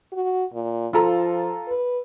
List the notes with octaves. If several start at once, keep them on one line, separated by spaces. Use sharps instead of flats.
F#4
A#2
F3 F4 A4 A#5
B4